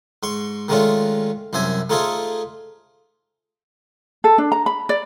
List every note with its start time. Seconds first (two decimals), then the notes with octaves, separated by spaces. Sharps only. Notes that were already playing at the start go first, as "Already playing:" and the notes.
0.23 G#2 C6 C#6
0.68 D#3 G#3 A3 C#4 D4 F4
1.53 C2 F#2 C5 E5 G#5
1.90 A3 D#4 F4 G#4 A4 C5
4.24 A4
4.38 D4
4.52 A#5
4.66 B5
4.89 D5